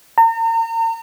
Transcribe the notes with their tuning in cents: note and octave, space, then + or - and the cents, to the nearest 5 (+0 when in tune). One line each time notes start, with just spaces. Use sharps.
A#5 -40